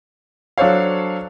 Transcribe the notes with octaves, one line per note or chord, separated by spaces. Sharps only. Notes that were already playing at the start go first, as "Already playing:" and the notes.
F#3 D4 A4 C5 C#5 F5